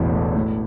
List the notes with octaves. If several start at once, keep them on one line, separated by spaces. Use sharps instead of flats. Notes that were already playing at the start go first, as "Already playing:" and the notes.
Already playing: E1 A1 E2 E4
A3
A2